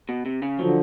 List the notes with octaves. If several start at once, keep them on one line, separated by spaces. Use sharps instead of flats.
B2
C3
C#3
D3 F3 F#3